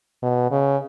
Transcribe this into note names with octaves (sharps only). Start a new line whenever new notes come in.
B2
C#3